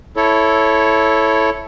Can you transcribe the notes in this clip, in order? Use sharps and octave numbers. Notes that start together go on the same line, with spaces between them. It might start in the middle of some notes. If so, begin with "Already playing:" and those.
E4 A4 C#5